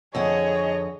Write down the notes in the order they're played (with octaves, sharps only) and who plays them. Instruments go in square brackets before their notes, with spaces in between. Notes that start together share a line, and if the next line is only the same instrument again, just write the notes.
[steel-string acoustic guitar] F2 D3 F#5 [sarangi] G#4 [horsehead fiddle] C#5 [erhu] D#5